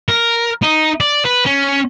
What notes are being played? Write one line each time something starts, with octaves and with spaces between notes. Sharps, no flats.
A#4
D#4
D5
B4
C#4